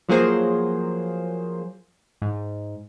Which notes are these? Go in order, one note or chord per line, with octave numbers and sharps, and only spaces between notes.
F3 F#3 A#3 G#4 C5
G#2